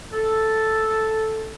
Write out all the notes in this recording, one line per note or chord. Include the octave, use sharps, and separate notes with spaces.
A4